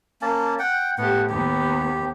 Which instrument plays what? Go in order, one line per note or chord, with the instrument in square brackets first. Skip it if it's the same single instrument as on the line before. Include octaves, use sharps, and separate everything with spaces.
[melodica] A#3 C#4 A5
F#5 G5
[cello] A2 G4 [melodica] B3 F#5
[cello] D#2 B3 [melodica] G4